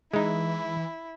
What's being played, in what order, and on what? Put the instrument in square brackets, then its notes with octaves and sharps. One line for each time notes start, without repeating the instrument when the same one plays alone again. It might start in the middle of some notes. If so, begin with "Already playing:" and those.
[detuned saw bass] E3 [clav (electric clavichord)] G#3 D#4 [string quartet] E4